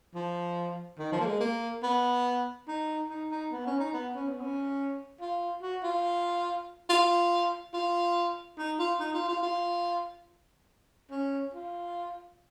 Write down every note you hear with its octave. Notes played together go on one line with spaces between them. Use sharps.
F3
D#3
F3
A#3
G#3
A#3
B3
D#4
D#4
D#4
B3
C#4
D#4
B3
C#4
B3
C#4
F4
F#4
F4
F4
F4
D#4
F4
D#4
F4
F4
F4
C#4
F4